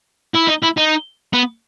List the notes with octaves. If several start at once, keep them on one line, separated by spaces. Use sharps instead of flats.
E4
D#4
E4
D#4
B3